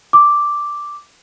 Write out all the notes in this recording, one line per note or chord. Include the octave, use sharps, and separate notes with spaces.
D6